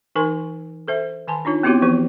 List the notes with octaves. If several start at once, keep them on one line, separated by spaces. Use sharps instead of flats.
E3 D#4 A#4 G#5 C6 C#6
A4 C5 E5
D#3 G#5 A5 C6
D4 D#4 F4 C#5
B3 C4 E4 F#4 G4 C#5
E3 F3 B3 G4 C#6